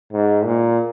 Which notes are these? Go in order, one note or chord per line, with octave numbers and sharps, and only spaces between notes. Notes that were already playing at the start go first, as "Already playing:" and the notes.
G#2
A#2